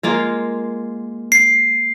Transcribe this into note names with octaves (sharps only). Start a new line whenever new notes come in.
G#3 A#3 F4
C7